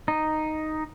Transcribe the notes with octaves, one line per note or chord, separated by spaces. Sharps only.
D#4